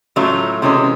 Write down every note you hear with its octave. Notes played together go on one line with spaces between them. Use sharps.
A2 F#3 A3 C#4 F4
C3 E3 G#3 C#4